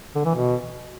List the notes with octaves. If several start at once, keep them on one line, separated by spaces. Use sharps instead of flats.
D3
E3
B2